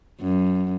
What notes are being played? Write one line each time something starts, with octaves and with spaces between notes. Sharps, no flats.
F#2